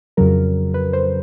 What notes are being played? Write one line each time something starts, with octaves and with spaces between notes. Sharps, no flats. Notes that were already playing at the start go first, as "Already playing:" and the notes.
F2 C#3 F#3 A#4
B4
C5